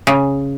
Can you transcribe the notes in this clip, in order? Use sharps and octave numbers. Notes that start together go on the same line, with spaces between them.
C#3